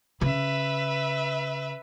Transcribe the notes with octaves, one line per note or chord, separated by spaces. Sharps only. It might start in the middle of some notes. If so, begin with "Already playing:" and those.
C#3 B4 E5